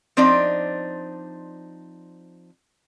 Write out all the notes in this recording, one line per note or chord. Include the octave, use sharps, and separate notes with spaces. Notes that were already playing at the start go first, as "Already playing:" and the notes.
F3 C4 D4 D#4 D5